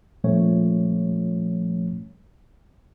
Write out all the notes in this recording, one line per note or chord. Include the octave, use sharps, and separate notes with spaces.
A#2 F3 G3 A3 C#4 C#5